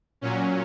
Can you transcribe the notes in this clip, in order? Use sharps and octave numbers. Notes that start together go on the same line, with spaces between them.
A#2 F#3 C#4